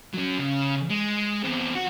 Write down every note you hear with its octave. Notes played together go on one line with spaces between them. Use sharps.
F#3 C#4
C#3
G#3
E2 C4
F#4